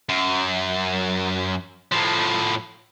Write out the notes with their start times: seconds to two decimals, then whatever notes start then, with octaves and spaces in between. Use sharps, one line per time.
0.09 F#2
1.92 A2 F3